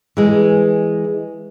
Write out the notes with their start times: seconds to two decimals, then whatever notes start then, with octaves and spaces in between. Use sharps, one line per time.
0.17 E3 G#3